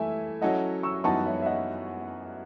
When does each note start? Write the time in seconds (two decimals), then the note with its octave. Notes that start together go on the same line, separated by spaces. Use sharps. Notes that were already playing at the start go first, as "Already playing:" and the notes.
Already playing: E3 A3 E4 E5 G#5
0.42 F#3 C#4 E4 A4 D#5 F#5
0.83 C#6 E6
1.04 F#2 E3 B3 D#4 F#4 A5 C#6
1.26 C#5 E5
1.42 E5
1.46 D#5 F#5